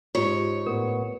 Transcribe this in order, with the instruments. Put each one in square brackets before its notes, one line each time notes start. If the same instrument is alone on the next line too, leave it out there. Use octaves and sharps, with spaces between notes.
[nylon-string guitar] G#2 [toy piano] F4 G4 [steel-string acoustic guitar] C#5
[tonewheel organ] A2 B3 [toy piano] A#4